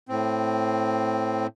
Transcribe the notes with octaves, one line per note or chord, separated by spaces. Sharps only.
A2 C4